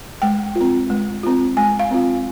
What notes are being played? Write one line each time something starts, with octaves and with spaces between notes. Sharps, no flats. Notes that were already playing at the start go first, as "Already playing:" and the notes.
G#3 G5
F4
C4
G#3
C4 F4
G#3 G#5
F5
C4 F4